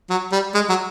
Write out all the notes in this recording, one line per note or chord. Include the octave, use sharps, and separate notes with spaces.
F#3
G3
G#3
F#3